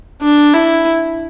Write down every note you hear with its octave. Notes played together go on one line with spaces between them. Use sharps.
D4
E4